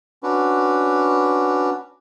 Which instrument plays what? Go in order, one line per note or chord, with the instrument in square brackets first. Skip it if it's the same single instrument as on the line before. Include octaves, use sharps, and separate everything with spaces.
[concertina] C#4 D4 F#4 B4